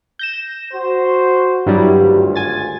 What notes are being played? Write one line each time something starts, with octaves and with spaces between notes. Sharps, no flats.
G6 A#6 E7
F#4 C5
G2 F#3 G3 E4
G#1 D2 F4
G#5 A6